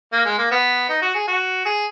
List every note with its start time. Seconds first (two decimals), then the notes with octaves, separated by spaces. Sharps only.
0.12 A#3
0.25 G#3
0.38 A#3
0.51 B3
0.89 D#4
1.02 F#4
1.15 G#4
1.28 F#4
1.66 G#4